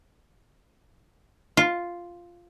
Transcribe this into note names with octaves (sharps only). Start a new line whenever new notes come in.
F4